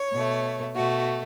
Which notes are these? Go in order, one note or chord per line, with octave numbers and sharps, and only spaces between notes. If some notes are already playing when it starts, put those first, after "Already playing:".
Already playing: C#5
B2 A3
B2 A3 F#4